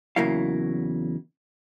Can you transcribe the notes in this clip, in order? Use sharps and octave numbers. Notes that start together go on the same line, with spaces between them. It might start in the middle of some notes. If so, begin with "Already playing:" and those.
E2 C#3 F#3 A#3 E4 F5